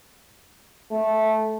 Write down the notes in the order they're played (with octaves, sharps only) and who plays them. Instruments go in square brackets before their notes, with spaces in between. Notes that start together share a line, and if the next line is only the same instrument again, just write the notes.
[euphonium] A3